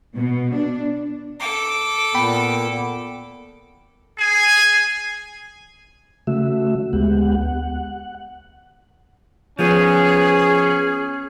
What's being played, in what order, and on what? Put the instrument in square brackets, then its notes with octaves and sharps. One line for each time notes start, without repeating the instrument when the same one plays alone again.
[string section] B2
D4
[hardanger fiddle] A4 D6
[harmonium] A#2 [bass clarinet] B3 [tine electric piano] G5 B5
[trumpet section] G#4 G#5
[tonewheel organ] C#3 A3 F#4 E5
D2 G#3 B3 G4 F#5
F#5
[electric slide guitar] F3 B3 [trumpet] C#4 [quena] G#4